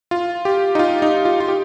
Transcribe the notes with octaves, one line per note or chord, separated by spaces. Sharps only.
F4
G4
D#4
F4
D#4
F4
F4
G4